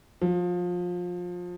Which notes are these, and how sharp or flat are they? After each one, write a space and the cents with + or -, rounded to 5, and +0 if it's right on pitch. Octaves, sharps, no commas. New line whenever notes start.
F3 +25